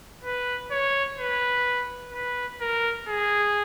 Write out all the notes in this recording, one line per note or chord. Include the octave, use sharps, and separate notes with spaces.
B4
C#5
B4
B4
A#4
G#4